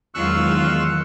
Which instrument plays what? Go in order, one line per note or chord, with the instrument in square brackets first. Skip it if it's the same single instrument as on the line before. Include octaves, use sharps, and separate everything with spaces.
[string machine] E2 D#3 G#3 [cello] F#3 F4 [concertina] C#6 E6 F#6